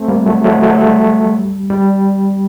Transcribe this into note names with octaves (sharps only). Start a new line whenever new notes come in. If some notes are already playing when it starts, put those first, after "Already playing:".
Already playing: A3 C4
G3 A#3
F#3 A3
F#3 A3
F#3 A3
A3
G3
G3